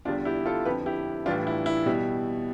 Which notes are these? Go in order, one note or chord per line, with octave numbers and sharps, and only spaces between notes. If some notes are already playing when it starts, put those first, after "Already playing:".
E2 D3 G3 D4 F4
E4 G4
F4 A4
F2 D3 F3 G4 B4
E4 G4
A2 E3 G3 D4 F4
E4
E4
B2 G3